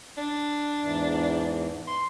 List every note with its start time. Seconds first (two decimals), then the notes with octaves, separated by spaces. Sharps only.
0.17 D4
0.82 E2 G#2 E3
1.87 C6